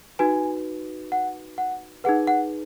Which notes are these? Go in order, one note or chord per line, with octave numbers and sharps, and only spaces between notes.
D#4 F#4 B4 G#5
F#5
F#5
D#4 G#4 B4 F#5
F#5